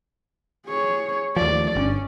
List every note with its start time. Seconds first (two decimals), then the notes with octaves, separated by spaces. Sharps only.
0.66 G#4 C#5
1.36 D#2 F3 A3 D5
1.76 G1 C#4